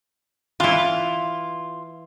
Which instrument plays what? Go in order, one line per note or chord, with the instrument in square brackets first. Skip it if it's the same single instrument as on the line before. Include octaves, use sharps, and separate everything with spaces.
[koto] E3 E4 [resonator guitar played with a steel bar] F4